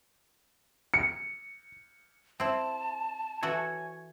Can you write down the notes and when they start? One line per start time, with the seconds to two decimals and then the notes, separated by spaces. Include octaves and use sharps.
0.94 C#7
2.40 C4 E4 A5
3.43 E3 F#4 A4 C#5 G#5